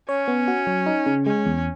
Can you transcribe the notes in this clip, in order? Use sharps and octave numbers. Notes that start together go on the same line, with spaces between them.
C#4 C#5
B3
F#4
F#3
D#4
C#3
G#3 C#4
E2